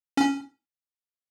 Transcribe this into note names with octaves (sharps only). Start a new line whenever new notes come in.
C#4